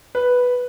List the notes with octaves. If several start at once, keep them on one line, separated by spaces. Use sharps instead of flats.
B4